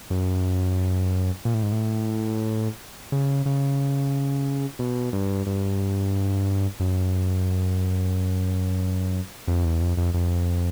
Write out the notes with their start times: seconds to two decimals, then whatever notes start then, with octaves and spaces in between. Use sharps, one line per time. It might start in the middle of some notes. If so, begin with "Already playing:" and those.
0.10 F#2
1.45 A#2
1.54 A2
1.63 G#2
1.72 A2
3.12 C#3
3.46 C#3
4.79 B2
5.13 G2
5.47 G2
6.80 F#2
9.48 F2
9.65 E2
9.81 F2
9.97 F2
10.14 F2